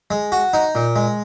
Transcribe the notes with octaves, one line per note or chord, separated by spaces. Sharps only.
G#3
F#4
D#4
A#2
G#3